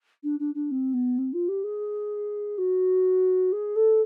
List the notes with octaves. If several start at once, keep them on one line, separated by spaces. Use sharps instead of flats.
D4
D4
D4
C4
B3
C4
F4
G4
G#4
F#4
G#4
A4